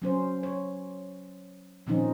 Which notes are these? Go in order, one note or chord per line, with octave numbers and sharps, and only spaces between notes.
F#3 C#4 C5
C#5
A#2 D#3 F3 C4 C#4 D#4